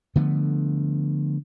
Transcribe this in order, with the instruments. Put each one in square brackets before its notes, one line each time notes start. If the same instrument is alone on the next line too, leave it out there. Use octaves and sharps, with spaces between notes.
[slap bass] D3 F3 A3 B3